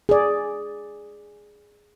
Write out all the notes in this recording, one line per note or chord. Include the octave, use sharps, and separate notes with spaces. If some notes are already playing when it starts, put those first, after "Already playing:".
G#4 D5